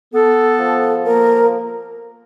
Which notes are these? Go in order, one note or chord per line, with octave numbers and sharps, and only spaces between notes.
B3 A4
F3
A#3 A#4